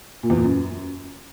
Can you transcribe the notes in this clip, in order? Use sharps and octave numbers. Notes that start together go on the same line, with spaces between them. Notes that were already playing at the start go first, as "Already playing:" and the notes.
A#2
E2
A#2
F#2